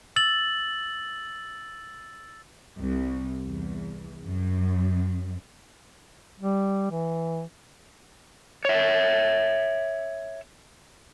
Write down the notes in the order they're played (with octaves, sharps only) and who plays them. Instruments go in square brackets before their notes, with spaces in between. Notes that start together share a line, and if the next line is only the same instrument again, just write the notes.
[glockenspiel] E6 A6 F#7
[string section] C2
E2
F#2
[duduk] G3
E3
[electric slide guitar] C#5 E5